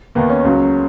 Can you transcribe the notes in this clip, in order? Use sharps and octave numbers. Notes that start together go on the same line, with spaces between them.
D#2 D#3 A#3 B3
C#4
C#2 C#3 F#3